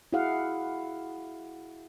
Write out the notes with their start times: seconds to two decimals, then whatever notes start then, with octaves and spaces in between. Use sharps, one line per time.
0.13 E4 F#4 G#4 F5 F#5